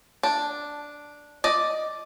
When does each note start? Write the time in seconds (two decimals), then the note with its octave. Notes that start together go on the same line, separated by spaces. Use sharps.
0.23 D4
1.44 D5 D#5